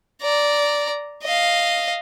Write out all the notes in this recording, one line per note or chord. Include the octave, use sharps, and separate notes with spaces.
D5 A#5
D#5 F5